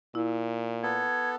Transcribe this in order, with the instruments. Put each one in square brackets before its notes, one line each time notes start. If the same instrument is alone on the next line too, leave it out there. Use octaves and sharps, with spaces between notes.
[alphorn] A#2 [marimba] E4
[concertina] B3 A4 [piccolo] G#6